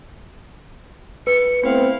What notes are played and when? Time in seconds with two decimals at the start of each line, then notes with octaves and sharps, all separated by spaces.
1.27 B4 C#7
1.63 A3 B3 C4 E4 F5